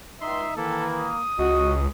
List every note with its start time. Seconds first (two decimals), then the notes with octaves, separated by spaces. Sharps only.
0.22 C#2 D#4 E5 C6
0.57 D#3 E3 A#3 E4 A4
0.97 D#6
1.39 C#2 F#4 D#5